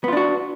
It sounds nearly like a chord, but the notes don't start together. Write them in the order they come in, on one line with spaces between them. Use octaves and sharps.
B3 F4 D4 F#4